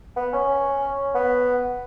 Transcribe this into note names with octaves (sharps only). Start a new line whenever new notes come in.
B3
C#4
B3